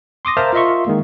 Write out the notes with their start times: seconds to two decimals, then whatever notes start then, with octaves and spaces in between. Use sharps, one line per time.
0.25 C6 D6 D#6 A#6
0.37 A#4 C5 E5 F5 A5 A#5
0.53 F4 A#4 D#5 E5 C6 C#6
0.87 D#3 G#3 A#3